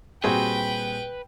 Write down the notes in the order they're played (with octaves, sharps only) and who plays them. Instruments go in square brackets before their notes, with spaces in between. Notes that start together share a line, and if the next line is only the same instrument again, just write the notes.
[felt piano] A#2 G3 [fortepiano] C4 F#4 G#4 [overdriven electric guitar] B4 [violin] G5